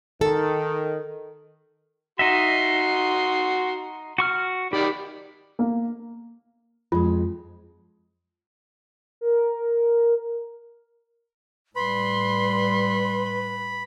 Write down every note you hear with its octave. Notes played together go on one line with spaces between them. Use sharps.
D#3 A4
D#4 F#4 D#5 E5 C6
F#4 C#6 F6
D#3 G4 D5 B5
A#3
F2 G#3 F4
A#4
A2 G3 B4 B5 C6